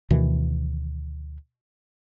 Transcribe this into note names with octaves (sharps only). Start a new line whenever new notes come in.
D2 B2 D#3 E3